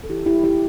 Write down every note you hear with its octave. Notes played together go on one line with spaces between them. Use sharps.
A4
E3 E4 G4
E4 G4
G3
E4 G4